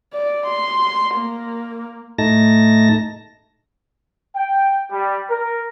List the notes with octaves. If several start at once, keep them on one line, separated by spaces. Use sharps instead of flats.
D5
C6
A#3
A2 A3 D#4 A5 A#6
G5
G3
A#4